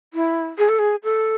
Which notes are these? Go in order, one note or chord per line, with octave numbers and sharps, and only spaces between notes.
E4
G#4
A4
G#4
A4